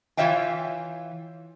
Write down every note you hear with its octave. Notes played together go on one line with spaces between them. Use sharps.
E3 F4 C#5 E5 F5 G5